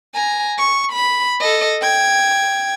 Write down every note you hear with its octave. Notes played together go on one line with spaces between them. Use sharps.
G#5 A#5
C#6
B5
A4 D#5
G5 G#6